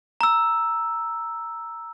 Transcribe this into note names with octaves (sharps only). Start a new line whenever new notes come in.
A#5 E6